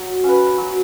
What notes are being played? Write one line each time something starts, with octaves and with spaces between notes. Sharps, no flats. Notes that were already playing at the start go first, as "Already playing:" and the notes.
Already playing: F#3
C#4 F#4 B4
F#3